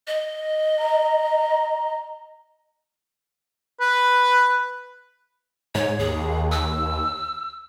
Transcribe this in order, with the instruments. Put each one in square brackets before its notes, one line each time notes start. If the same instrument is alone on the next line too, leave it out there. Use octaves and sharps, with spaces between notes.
[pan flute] D#5
[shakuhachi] A#5
[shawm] B4
[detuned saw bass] G#2 [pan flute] C#5
[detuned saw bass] D#2 [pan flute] G#4
[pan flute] E6